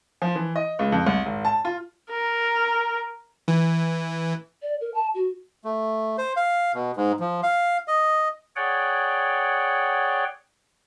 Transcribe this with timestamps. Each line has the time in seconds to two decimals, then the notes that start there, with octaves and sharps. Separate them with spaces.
0.22 F3
0.35 E3
0.56 D#5
0.79 C#2
0.92 F2
1.07 C2
1.26 G#1
1.45 A5
1.65 F4
2.10 A#4
3.48 E3
4.62 D5
4.81 A#4
4.94 A5
5.15 F#4
5.64 A3
6.18 C5
6.37 F5
6.74 B2
6.97 G#2
7.20 F3
7.43 F5
7.88 D#5
8.56 G#4 C#5 D5 F#5 G5